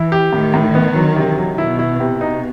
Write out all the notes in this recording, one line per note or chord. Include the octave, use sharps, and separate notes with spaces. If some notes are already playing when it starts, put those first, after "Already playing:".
Already playing: E3 E4
G4
A2 D#3
A2
B3
F#3
C3
F#3
B2 E4
E4
C3
B2 D#4